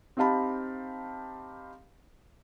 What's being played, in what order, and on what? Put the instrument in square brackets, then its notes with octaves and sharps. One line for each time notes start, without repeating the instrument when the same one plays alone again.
[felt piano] C4 D#4 G4 F5 A5 B5